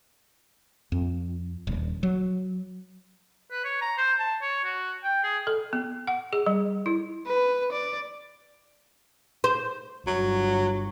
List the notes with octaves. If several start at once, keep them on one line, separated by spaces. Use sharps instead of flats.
F2
D#1
F#3
B4
C#5
A#5
C5
A5
C#5
F#4
G5
G#4
A4
B3
F#5
G#4
G3
E4
B4
D5
C5
G1 F#3